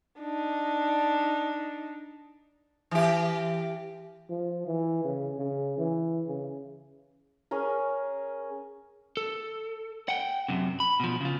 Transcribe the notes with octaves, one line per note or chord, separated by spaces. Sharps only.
D4 D#4
E3 G4
F3
E3
C#3
C#3
E3
C#3
C#4 G#4 A#4
A4
F#5 G5
F#2 C3
B5
B2 F3
C#3 F4